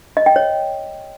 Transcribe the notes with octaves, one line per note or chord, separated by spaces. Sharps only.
D#5
G5
C#5